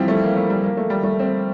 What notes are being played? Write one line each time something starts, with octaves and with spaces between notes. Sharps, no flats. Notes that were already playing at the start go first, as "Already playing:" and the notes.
Already playing: E3 F3 G3 C4
A3
A#3
A3
G3
A#3
A3
G3
A3
C4